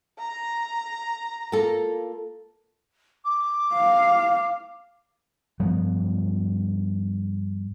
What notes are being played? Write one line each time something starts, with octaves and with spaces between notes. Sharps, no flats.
A#5
A#3 F4 A4
D6
F5
G2 F3 F#3 B3